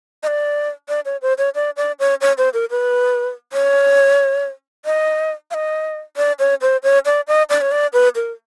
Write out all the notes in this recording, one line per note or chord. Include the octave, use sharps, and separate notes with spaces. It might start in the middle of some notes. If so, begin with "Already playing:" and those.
D#5
D5
D5
C#5
C5
C#5
D5
D5
C#5
C#5
C5
A#4
B4
C#5
D#5
F5
D#5
D5
C#5
C5
C#5
D5
D#5
D5
C#5
D5
B4
A#4